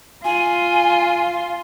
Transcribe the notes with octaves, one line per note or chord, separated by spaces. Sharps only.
F4 G#5